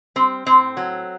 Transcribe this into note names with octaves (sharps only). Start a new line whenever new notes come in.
G3 C4
A2 C4
F#3